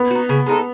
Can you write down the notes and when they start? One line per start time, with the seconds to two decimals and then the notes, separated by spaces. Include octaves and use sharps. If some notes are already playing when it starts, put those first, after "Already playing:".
Already playing: B3
0.10 D#4 F#4
0.29 C#3
0.46 G#3 D#4 A4